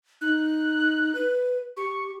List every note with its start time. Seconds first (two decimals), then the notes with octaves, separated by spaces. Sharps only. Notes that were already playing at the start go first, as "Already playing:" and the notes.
0.21 D#4 F#6
1.15 B4
1.77 G4 C#6